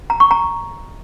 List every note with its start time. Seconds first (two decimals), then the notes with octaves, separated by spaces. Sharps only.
0.10 A#5
0.20 C#6
0.31 A#5